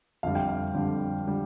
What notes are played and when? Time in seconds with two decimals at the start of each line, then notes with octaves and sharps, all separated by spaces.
0.23 F2 D3 G3 F5
0.35 G5
0.49 F5
0.73 F2 D3 G3
1.27 D3 G3